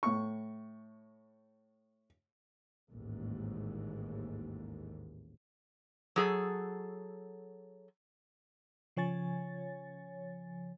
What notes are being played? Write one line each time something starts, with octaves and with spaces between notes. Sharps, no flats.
A2 C#6
A1 D#2 G#2
F#3 G#4 A4
C#3 F3 C#5 G#5 A6